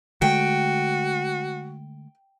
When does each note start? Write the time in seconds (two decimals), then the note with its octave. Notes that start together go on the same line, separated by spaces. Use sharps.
0.22 D3 G#3 A3 F#4 G5